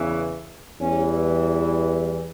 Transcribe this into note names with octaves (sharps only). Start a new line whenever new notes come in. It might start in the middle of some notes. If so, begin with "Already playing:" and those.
Already playing: E2 C#3 E3
E2 E3 G3 C#4